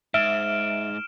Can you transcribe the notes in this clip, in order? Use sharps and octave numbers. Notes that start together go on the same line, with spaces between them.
G#2 E5 F6 D7 E7